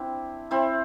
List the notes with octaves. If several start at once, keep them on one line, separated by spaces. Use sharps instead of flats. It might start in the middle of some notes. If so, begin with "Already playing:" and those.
Already playing: C4 D4 E4
C4 E4